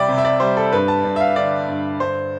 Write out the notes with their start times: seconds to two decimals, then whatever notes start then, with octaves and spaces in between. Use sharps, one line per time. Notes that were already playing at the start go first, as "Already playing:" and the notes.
Already playing: C2 G3 D5 E5 G5
0.08 C3
0.18 E5
0.25 D5
0.40 G3 C5
0.57 A4
0.72 G2 B4
0.88 A5
1.04 G2
1.16 E5
1.20 F5
1.36 D3 D5
1.68 G2
2.00 G2 C5